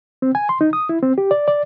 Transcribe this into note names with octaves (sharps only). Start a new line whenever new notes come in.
C4
G#5
C6
D#4
D#6
E4
C4
G4
D5
D5